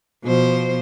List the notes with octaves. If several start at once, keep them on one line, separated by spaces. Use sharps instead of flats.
B2 F3 C5